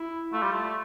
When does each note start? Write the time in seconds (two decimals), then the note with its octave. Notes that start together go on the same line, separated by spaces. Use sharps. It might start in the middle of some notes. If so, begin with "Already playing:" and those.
Already playing: E4
0.33 A3 F4
0.42 G3
0.53 A3